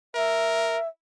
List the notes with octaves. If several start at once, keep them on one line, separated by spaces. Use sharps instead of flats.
A#4 E5